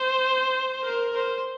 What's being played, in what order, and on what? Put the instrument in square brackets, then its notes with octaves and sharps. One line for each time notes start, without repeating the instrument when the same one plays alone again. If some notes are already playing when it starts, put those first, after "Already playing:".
Already playing: [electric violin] C5
A#4
C5